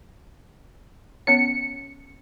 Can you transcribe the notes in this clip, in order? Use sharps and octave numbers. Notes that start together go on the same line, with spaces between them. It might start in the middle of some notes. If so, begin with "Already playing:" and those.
B3 C#4 C#5 C#7